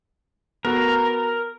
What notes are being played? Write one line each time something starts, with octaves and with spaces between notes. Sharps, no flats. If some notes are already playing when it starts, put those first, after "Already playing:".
B3 F#4 A4 A#4